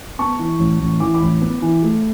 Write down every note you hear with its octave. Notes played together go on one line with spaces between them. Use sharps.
B3 A5 C#6
E3
A1
A1
E3 D6
B5 D6
A1
B3
E3
A3